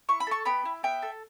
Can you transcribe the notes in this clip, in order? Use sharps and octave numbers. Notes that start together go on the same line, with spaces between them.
E4 C#6
B5
A4 A5 C#6
B3 G5 B5
E4
B3 E5 G5
A4